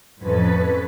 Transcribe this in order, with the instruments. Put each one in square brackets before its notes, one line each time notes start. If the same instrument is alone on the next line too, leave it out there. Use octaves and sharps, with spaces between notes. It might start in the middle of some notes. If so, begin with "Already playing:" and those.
[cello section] F2 A2 C#4 A4 B4